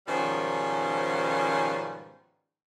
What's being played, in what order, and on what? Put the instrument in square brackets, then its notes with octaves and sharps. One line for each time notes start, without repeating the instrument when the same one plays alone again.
[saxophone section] G#2 B2 D#3 F3 G3 C#4